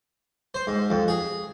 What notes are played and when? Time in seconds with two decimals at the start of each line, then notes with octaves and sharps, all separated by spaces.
0.54 C5
0.67 G#2
0.90 F2
1.08 G#4